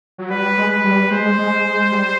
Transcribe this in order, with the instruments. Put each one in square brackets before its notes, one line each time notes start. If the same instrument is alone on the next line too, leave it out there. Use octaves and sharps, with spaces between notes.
[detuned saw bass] F#3
[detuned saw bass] G3 [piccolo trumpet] B4
[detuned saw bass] G#3
[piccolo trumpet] B4
[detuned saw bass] G3
[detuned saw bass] G#3 [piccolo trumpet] C5
[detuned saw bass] G#3
G#3
G3